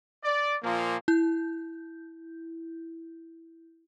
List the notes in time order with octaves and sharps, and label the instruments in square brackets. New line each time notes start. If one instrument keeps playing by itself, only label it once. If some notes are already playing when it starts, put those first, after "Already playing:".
[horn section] D5
A#2 F3 A#3
[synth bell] E4 G6